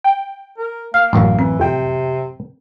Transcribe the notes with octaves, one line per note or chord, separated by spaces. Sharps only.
G5
A#4
A#3 F5 F6
A1 F#2
E3 C4
F2 C3 G5